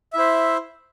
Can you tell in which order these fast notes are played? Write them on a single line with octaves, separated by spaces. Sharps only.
E5 E4 C5